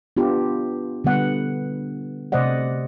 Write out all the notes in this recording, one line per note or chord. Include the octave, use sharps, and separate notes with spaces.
B3 D4 F4 G4
D3 G3 B3 F#5
C3 A3 C5 D5 D#5 F#5